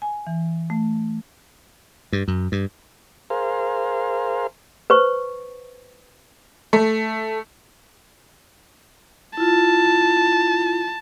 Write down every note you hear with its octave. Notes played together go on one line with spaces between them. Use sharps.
G#5
E3
A3
G2
F#2
G2
G#4 A#4 C5 F5
B4 C5 C#6
A3
E4 F4 A5